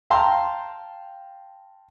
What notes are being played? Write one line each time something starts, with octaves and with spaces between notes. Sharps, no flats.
F5 G5 A5 A#5 C6